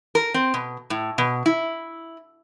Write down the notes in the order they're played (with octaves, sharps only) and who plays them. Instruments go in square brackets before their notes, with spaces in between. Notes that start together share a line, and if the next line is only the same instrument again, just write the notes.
[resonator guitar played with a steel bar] A#4
C4
B2
A2
B2
E4